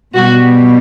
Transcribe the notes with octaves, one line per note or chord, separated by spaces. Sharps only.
B2 G3 F#4